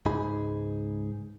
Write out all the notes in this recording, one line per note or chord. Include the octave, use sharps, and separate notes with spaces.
C#2 G#2 D#4 G#4 B5